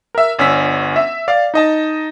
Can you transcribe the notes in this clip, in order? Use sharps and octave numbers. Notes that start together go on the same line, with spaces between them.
A#4 E5
G1 C#4 D4 E6 B6
E5
D5 F5
D#4 D#5 A5